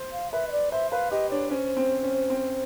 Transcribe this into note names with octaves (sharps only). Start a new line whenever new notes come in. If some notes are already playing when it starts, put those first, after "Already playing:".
Already playing: C5
F5
B4 E5
D#5
D5
C5 E5
B4 F5
G4 D#5
D4 C#5
C#4 C5
C4
C#4
C4